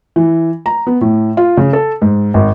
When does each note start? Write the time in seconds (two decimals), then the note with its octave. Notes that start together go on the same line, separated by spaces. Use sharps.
0.16 E3
0.66 A#5
0.87 B3
1.01 A2
1.37 F4
1.57 C#3
1.73 A4
2.02 G#2
2.34 G#1